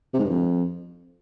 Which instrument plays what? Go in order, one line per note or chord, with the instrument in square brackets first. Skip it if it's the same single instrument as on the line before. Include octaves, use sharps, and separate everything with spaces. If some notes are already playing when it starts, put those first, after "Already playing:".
[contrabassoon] C3
G#2
G2
F2